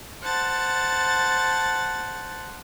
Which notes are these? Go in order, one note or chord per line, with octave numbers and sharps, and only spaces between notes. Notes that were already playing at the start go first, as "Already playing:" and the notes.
C5 F#5 A5 A6